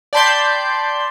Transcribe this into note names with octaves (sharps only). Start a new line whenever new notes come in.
D5 G5 A5 B5 C6 G6